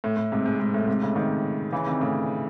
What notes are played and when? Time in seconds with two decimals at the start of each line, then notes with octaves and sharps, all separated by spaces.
0.04 A2
0.17 A2
0.32 G#2 C3
0.46 G#2
0.60 G#2
0.74 A2
0.87 G#2 C3
1.02 A2 C#3
1.15 C3 D#3
1.72 C#3 E3
1.86 C3 D#3
2.00 A2 C#3